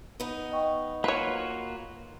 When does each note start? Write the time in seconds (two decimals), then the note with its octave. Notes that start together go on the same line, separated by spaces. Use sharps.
0.20 B3 D#4
0.52 D#5 G5 C#6
1.04 A#3 F4 F#4 B4 C#5